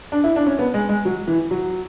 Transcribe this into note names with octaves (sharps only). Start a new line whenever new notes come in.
D4
E4
D4
C#4
B3
G#3
G#3
F#3
E3
F#3